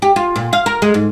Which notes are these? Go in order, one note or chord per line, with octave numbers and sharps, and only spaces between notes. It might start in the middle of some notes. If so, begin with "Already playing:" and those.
G4
F4
A#2
F5
A#4
G#3
G#2